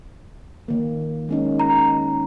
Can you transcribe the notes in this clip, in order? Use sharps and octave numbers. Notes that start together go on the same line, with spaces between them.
D#3 A#3
G#3 C#4 D#4
A#5